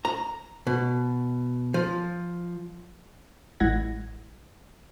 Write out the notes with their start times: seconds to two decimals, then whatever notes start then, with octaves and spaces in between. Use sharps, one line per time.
0.05 A#5
0.67 B2
1.74 F3
3.60 A1 G#3 E4 F#5 G#6 A#6